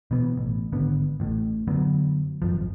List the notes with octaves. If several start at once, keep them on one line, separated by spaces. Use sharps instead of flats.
B2 E3 B3
A1
G#1 D3 B3
A1 A2
F#2 D3 F#3 B3
G#1 F#2 F3